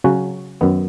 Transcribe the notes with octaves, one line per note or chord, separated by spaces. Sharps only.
C#3 F#3 C#4 F#4
F#2 D#3 B3